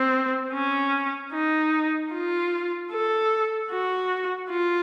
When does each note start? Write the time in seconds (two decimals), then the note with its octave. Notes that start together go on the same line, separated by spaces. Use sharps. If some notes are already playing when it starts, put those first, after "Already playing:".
Already playing: C4
0.53 C#4
1.33 D#4
2.12 F4
2.92 A4
3.71 F#4
4.50 F4